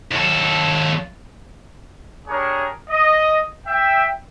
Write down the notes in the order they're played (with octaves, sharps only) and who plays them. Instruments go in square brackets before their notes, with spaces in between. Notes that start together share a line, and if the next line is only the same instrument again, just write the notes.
[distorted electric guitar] D#2 A4
[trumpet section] D4 G4 G#4 A#4 C#5
D#5
E5 G5